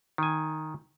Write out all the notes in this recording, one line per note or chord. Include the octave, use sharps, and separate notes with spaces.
D#3 G#5